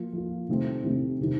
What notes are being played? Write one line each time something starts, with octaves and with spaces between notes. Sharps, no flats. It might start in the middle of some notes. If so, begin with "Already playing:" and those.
Already playing: F3 A#3 F4
F3 A#3 F4
C3 D#3 A3 C4
C3 D#3 A3 C4
C3 D#3